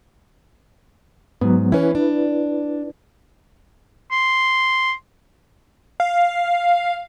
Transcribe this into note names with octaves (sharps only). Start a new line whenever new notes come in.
G#2 F#3 B3
E3 C#4 E4 B4
D4
C6
F5